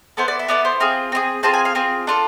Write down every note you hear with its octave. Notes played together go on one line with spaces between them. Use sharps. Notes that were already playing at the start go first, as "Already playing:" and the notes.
B3 E4 A4 C5
D5
E5
B3 E4 A4 D5
C5
C4 F4 G#4
C4 F4 G#4
C4 F4 G#4 A5
G#5
F5
C4 F4 G#4
D4 F4 A4